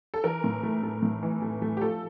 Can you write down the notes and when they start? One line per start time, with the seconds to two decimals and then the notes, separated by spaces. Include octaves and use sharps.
0.14 A4
0.24 E3 A#4
0.44 A2
0.63 A3
0.83 A3
1.02 A2
1.23 E3
1.42 A3
1.62 A3
1.77 G4
1.81 F3 A4